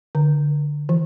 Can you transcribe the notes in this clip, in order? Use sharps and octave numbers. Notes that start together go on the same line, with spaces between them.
D3
E3